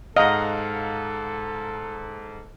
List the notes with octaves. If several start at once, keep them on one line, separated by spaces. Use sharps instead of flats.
G#2 A4 D#5 F5 F#5 A#5 F6